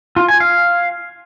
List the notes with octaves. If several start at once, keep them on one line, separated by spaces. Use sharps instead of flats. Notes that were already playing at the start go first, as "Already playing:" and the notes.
F4
G#5
F5